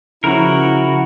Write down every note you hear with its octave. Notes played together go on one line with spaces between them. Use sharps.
C#3 F3 C#4 E4 F#4 A#4